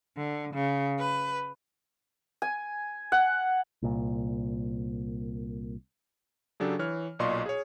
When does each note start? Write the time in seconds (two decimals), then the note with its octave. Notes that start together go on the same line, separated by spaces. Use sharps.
0.17 D3
0.54 C#3
0.99 B4
2.42 G#5
3.12 F#5
3.82 C2 A#2
6.60 C#3 F#3 D4 G4 A4
6.79 E3 C#5 F6
7.19 B1 A#2 D5 D#5 C6 C#6
7.46 G#4 C#5